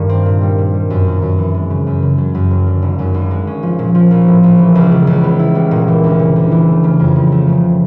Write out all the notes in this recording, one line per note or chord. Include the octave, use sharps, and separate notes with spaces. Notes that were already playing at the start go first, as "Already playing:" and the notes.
Already playing: G2 D#3 G3 A3
C4
A#2
G3
A#2
G3
F#2
D#3
F#2
E3
G#3
C#3
F#2
C#3
F#3
F#2
F#1
D3
G#1
F#2
G#1
G#3
C#4
F3
A#2
F3
A#1
A2
A#1
E3
C#2
C#3
C#2
B3
E4
G3
A#2
E3
D2
C#3
D2
E3
A3
C#3
F2
F3
A3
C#3